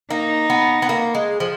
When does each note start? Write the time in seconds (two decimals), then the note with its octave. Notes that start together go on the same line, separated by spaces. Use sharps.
0.10 A#3 D#4
0.50 B3
0.82 B3
0.89 A#3
1.15 G#3
1.40 F3